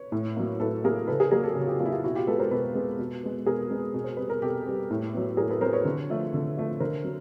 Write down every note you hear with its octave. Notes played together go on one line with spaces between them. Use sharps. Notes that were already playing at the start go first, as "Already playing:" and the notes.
Already playing: B4 C#5
A2
F#3 A#3
A2 A4 B4
F#3 A#3 G#4 A#4
C#3 A4 B4
G#4 A#4
F#3 A#3 G#4 A#4
G4 A4
C#3 F#4
F4 G4
F#3 A#3 F4
E4
F4
B2 E4 F#4
F4 G4
G#3 B3 A4 B4
A#4 C5
B2 A4 B4
G#3 B3
B2
G#3 B3
B2 G#4 A#4
G#3 B3
B2
C5
G3 B3 B4
A#4
B2 G4 A4
G3 B3
A2
F#3 B3
A2 G#4 A#4
A4 B4
F#3 B3 A#4 C5
B4 C#5
D3
F3 A3
D3
F3 A3
D3 A#4 C5
F#3